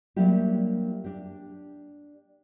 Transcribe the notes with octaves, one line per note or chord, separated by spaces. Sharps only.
F#3 G3 A#3 D4 E4 G4
D4 G4